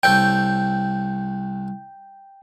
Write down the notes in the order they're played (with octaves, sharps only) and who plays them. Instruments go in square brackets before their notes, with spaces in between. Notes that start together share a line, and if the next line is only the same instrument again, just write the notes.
[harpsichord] C2 A4 C#5 [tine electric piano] G5 G6